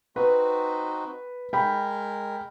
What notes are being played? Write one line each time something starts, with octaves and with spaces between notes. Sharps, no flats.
C4 D#4 F#4 B4
G#3 A#4 G5 B5